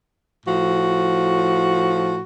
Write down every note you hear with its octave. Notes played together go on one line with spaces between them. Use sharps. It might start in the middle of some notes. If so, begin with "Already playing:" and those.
A2 F3 F#4